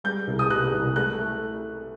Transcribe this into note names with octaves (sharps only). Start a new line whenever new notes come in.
G3 G6
C2
D#6
C2 F#6
C2
A3 F#6
A3